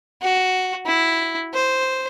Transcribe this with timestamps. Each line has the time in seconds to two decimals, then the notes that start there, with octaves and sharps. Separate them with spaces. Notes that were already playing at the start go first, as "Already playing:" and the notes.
0.22 F#4
0.86 E4
1.54 C5